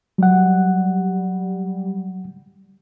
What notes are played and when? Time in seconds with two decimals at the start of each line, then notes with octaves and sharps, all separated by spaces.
0.18 F#3 G3 F#5